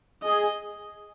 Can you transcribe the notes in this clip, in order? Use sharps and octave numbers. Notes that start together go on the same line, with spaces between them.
G#4 D#5